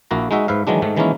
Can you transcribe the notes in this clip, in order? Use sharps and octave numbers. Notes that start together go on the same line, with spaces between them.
A#1 A#3 E4 F#4 A#5
G#3 D#4 F#4 E5 F#5
G#2 B4 E5 F5
D#3 E3 F#3 G#3 D4
G#2 D#3 A3
D#3 E3 G#3 A#3 C#4 E4